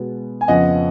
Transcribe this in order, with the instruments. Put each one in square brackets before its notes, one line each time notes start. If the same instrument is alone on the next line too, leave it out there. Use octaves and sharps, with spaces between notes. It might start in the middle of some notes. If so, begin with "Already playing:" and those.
Already playing: [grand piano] B2 G#3 B3
G#5
F2 C#3 F3 B3 D#5 F#5